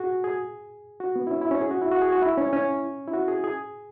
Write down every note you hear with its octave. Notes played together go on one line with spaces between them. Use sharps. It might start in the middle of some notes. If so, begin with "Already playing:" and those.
Already playing: F#4 G#4
G#4
F#4
B3
E4
C#4
E4
C#4
G#4
F#4
E4
F#4
G#4
F#4
E4
C#4
C#4
E4
F#4
G#4
G#4